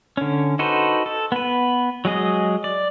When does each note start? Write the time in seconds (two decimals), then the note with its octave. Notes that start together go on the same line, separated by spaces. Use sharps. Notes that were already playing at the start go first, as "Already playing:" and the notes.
0.17 D3 C#4
0.59 D#4 F#4 A4 B4 C5
1.06 A4
1.32 B3 B4
2.05 F#3 G#3 G#4 D#5
2.64 D5